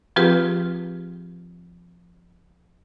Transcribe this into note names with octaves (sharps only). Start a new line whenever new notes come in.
F3 C4 F4 G4 G#4 B4